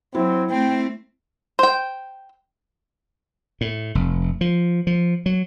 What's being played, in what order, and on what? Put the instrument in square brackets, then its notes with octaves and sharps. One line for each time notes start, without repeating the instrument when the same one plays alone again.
[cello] F#3 [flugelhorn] C4 [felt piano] E4
[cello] A3 C4 [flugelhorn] G5
[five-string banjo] C5 G5
[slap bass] A2
F1
F3
F3
F#3